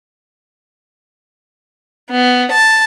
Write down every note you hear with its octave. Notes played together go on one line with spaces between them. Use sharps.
B3
A5